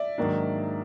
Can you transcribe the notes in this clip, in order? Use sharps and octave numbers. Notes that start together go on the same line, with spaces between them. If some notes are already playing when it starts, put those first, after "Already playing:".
Already playing: D5 E5
G#2 D#3 F#3 A#3 D4